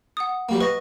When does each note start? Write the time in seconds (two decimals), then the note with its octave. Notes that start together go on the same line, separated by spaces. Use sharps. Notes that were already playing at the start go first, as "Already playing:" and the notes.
0.17 F#5 D#6
0.49 F#3 G3 A#3
0.61 B4 D#5 C#6 A#6